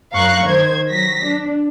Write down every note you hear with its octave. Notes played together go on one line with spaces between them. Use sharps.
F#2 F5 A#5 C#6 F#6
D#3 C5 G#6
F#3 A#6 B6
D4